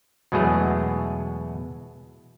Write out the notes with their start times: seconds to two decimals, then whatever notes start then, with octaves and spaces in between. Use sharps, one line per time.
0.32 E2 B2 F#3 G#3 A3 G#4